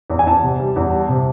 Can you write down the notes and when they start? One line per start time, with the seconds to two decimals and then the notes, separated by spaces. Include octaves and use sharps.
0.10 E2
0.19 G#5
0.26 E2 A5
0.43 C3
0.60 G3
0.76 E2
0.92 G3
1.09 C3